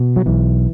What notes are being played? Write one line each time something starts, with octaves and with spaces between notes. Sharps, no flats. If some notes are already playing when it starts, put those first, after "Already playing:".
Already playing: B2
F#3
B1 E3